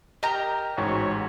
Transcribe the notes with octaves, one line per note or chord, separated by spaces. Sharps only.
G4 A#4 D#5 A#5
A1 G#2 F#4 G#4 C5 C#5